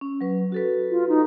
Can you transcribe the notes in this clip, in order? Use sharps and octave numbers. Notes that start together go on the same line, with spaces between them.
C#4
F#3 B4
F#4 A4 B4
F4
D#4